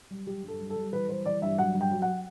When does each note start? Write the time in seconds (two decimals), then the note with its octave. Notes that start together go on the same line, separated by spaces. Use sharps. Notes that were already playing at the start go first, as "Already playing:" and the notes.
0.10 G3
0.27 G3 G4
0.43 G2
0.48 A4
0.60 G3
0.70 A4
0.76 G3
0.92 E3 B4
1.09 G3 C5
1.26 E3 D5
1.42 G2 E5
1.58 F#3 F#5
1.75 G2
1.81 G5
1.91 F#3
2.02 F#5